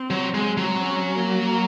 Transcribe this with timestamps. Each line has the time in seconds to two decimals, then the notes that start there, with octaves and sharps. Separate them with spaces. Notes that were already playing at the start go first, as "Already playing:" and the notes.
Already playing: C4
0.10 F#3
0.34 G#3
0.57 F#3
0.80 C#4
1.16 A#3